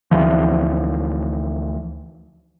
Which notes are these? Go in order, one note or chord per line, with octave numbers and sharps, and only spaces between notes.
D2 E3 F3